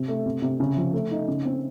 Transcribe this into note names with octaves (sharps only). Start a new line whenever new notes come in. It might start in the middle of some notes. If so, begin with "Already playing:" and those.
Already playing: C3
A3
C3
C3
C#3
F3
A3
D#4
C#3
C4